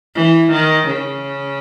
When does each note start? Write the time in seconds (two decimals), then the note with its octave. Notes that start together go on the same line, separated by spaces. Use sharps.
0.15 E3
0.51 D#3
0.88 C#3